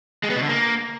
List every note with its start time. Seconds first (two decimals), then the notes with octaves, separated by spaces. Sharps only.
0.24 G#3
0.30 B3
0.36 B2
0.42 D3
0.49 A#3